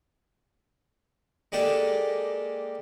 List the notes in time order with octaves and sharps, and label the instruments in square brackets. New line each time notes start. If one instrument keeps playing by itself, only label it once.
[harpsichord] G#3 A#3 D4 G4 A4